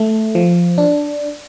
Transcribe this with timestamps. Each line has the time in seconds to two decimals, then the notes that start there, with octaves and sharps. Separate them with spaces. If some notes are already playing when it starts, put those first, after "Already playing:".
Already playing: A3
0.35 F3
0.78 D4